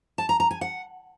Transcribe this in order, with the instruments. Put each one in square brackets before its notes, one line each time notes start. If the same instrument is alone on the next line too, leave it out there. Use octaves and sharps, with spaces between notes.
[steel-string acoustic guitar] A5
A#5
A#5
G#5
F#5